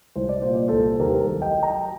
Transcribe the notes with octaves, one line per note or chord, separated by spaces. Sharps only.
C2 C5
D5
A#2 C5
D5
C2 A4 C5
D#2 G4 A#4
A#4
A4
F#3
D#5 G5
F#3
G5 A#5